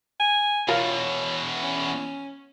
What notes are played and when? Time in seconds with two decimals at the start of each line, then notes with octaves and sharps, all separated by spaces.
0.20 G#5
0.68 E2 B2 F4 A#4 C#5 F5
1.63 C#4